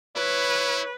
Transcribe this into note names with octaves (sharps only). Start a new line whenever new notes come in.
E4 B4 C#5